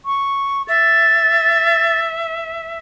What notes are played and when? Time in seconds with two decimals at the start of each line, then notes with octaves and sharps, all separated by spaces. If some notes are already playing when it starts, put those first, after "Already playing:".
0.06 C#6
0.68 E5 A6